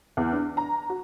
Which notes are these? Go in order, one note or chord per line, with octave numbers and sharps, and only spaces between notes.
E2
D4
A#5
F#4